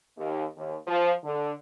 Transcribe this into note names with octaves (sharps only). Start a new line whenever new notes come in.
D#2
D#2
F3
D3